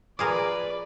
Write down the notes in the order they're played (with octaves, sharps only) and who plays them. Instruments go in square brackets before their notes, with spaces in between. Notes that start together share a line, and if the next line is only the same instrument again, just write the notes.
[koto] F3 G#4 A#4 [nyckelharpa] B4 D5 [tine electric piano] D6